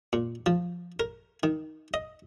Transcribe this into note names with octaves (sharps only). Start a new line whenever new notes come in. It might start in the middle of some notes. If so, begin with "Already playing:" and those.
A#2
F3
A#4
D#3
D#5